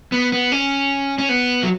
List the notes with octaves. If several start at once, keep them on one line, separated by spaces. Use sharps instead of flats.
B3
B3
C#4
C#4
B3
F#3